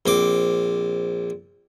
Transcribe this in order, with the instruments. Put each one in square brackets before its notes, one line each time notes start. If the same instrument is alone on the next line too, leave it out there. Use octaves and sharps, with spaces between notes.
[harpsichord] A#1 C4 D6